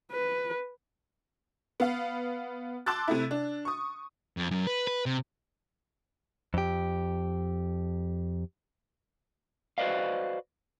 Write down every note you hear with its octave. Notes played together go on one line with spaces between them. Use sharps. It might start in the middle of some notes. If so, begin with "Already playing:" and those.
B4
B3 F5
A5 C6 D6 E6 F#6 A6
C3 A3 E4
D4
C#6 D#6
F2
F#2
B4
B4
C3
F2 G4
F#4 B4 C5 D5 D#5 F5